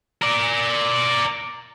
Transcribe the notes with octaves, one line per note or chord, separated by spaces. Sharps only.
A#4 D5